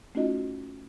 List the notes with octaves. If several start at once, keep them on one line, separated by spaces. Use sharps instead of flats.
A3 C#4 D#4 F4 F#4 D#5